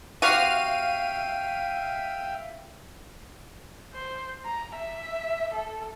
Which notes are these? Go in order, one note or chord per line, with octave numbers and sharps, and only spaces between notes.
C3 F#4 E5 F5 G5 D#7
C5
A#5
E5
A4